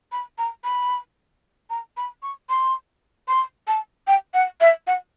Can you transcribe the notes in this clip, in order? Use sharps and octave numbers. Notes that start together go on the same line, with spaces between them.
B5
A#5
B5
A#5
B5
C#6
C6
C6
A5
G5
F#5
E5
F#5